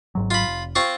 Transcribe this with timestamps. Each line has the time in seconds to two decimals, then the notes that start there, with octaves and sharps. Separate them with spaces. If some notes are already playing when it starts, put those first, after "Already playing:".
0.15 G#1 G#2 F#3
0.31 F4 B5
0.46 F1
0.75 C4 F4 C#6